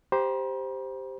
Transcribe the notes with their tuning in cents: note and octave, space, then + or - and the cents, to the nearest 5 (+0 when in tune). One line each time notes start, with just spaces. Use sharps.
G4 +0 C5 +0 A#5 +40